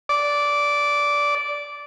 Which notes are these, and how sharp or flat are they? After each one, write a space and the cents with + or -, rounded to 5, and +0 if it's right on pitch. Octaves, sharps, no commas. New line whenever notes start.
D5 -10